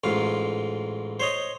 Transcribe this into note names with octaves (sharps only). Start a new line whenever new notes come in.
A1 G#2 F4
C5 C#5 D#5